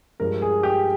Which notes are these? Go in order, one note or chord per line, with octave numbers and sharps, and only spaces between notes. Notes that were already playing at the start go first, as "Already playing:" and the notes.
G2 F3 G#3 A#4
G#4
G4